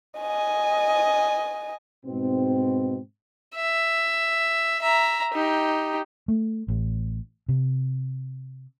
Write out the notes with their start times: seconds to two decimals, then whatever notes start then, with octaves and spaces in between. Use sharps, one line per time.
0.20 D#5 G#5
2.05 G#2 B2 C4
3.56 E5
4.82 E5 A#5
5.34 D#4 G4
6.28 A3
6.68 A1
7.48 C3